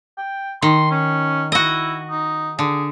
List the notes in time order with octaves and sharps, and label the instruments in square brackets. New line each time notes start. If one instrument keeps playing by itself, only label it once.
[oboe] G5
[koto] D#3 [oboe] C6
[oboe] C#4
[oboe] E4 [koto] F#4 D#5
[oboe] D#4
[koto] D3 [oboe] G#4